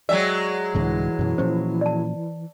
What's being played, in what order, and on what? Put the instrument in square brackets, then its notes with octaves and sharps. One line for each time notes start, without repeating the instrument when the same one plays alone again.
[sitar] F#3 G#3 E5 [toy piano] D5 F#5 G5
[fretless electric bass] C2 G#2 D3 [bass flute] E3
[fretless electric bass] F#2 B2
[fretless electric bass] A#2 F3 C#4 [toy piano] C5
[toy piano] D5 A5